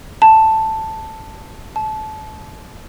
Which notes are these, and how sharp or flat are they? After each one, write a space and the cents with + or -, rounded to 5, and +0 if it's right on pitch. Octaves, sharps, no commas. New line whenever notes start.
A5 +5
A5 -25